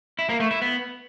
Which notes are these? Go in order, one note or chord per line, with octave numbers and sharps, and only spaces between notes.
E4
A#3
A3
E4
B3